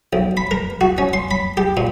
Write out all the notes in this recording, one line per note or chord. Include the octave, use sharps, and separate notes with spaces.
B1
B5
A#4
F#4
C#4
C6
B5
G4
A#2